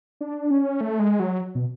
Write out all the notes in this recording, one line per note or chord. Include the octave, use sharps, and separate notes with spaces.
D4
C#4
A3
G#3
F#3
B2